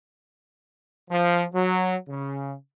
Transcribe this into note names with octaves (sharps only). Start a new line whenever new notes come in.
F3
F#3
C#3